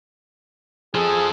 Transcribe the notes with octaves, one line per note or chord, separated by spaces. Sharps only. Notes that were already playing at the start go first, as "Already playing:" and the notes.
F3 G#4 A4